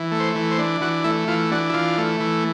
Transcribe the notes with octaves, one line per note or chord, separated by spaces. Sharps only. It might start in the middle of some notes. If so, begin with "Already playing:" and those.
Already playing: E3
A3
C5
E3
C5
D4
E3 F#4
A3 E4
E3 F4
D4 F#4
E4
E3 F4
A3
E3